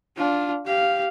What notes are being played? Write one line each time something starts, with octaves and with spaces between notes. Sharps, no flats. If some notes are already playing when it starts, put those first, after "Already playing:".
D4 F4
G4 F5